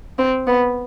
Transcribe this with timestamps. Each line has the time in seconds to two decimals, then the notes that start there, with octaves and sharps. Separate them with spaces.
0.18 C4
0.47 B3